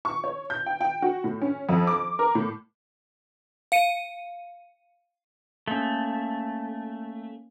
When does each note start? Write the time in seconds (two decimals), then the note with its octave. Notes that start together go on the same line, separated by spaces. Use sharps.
0.05 C#6
0.24 C#5
0.50 G6
0.66 G5
0.81 G5
1.02 F#4
1.24 A2
1.42 C#4
1.69 F2
1.87 D6
2.19 A#4
2.35 A2
3.72 F5 C#7 D#7
5.68 A3 A#3 C#4